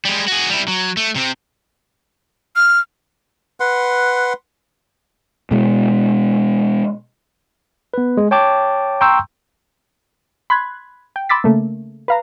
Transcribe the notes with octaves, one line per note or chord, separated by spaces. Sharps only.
G3 G#3
F#4 G#4
G3 E4
F#3
A3
C3 C4
F6
B4 F#5 C6
B2 G#3
B3 B4
G#3
C#5 G5 A5 D6
G5 A#5 C6 C#6 E6 G6
B5 C6 F#6 G#6
G5
B5 C6 D6 E6 A6 B6
C#3 A3 A#3
B4 F5 A#5